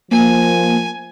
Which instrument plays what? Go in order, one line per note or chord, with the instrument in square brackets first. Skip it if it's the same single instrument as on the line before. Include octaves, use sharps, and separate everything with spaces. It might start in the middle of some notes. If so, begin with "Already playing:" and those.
[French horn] F3 [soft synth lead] A#3 [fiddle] G#5